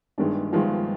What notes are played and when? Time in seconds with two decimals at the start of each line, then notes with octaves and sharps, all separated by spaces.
0.18 G1 G2 D#3 G#3 D4
0.53 G1 G2 D#3 F3 G#3 F4